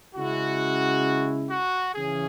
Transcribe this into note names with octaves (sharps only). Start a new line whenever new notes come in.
C#3 G#3 E4 F#4
F#4
C#3 E3 C#4 G#4